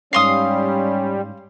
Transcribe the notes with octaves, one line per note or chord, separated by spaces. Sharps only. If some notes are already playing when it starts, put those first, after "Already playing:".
G#2 G3 C#4 F5 C6 D#6 C7